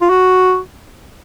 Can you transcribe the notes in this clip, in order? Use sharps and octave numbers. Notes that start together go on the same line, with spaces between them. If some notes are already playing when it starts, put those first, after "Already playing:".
F4
F#4